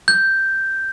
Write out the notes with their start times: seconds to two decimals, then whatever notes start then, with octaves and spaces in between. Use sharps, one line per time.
0.08 G6